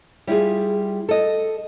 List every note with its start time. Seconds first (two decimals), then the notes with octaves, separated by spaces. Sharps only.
0.27 G3 E4 F4 G#4
1.09 A4 D#5